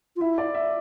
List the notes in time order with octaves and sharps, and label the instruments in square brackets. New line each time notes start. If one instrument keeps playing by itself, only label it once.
[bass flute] F4
[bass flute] E4 [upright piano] E5
[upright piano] D5
E5